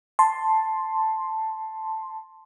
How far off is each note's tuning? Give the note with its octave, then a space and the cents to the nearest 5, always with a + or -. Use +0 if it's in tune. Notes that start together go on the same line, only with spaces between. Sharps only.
A5 +0 C6 +5